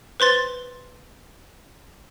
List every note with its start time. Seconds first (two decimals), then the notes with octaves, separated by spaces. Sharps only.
0.20 B4 C5 C6 A6